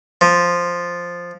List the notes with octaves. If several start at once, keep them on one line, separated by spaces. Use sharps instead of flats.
F3